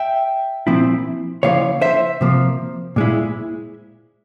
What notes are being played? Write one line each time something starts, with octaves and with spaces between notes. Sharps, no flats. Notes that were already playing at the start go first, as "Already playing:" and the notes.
Already playing: E5 G5
A#2 F3 C4 E4
C#3 F3 A#3 E4 C#5 F5
C5 E5
C3 F3 A#3
A#2 G#3 E4